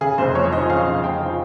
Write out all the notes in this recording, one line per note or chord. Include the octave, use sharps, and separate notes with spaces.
C#3 G#4
F1 C5
F2 C#5
F3 D#5
C#3 F5
F1
F2 G5
F3